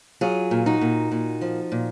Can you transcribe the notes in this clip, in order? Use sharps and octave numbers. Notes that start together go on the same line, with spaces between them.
F#3 F4 G#4
A#2
D#4 F#4
A#2
A#2
F3
A#2